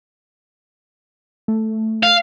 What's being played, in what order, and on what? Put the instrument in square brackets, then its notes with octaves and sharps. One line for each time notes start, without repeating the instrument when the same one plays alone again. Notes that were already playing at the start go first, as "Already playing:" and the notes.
[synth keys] A3
[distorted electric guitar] F5